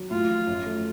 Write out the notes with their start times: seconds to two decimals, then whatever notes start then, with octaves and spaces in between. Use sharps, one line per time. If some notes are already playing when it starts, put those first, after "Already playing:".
Already playing: F#3
0.11 A2 F4
0.29 F3
0.47 F#2
0.66 A3